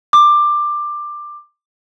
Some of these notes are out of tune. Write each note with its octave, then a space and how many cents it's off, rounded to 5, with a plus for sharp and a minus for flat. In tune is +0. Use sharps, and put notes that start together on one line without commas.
D6 +15